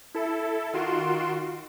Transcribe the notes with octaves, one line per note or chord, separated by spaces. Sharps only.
E4 A4
D#3 F4 F#4 C6 D7 E7